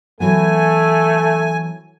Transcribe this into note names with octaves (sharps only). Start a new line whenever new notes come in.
E3 F#3 A3 B3 G#5